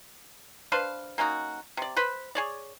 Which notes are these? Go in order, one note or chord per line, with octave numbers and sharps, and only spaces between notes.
D4 B4 C5 F5
A#3 C#4 D#4 F#4
C3 D5
B4 C5 B5
G#4 C#5 D5